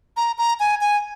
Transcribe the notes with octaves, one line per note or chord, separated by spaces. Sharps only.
A#5
A#5
G#5
G#5